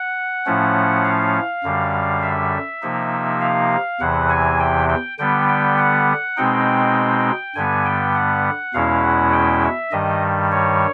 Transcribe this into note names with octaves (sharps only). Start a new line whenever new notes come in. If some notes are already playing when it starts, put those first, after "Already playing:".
Already playing: F#5
A2 F3 A3 C#4
F5
F#2 D3 G3
E5
C3 F3 A#3 D#4
F5
E2 C3 E3 F#5
G#5
G5
G5
D3 G3 B3 G5
G5
F#5
B2 G#3 C4 D#4 G5
G2 D3 G3 B3 G#5
G5
F#5
E2 B2 G#3 C#4 E4 F5
F#5
G5
E5
G2 D#3 G3 D#5
C#5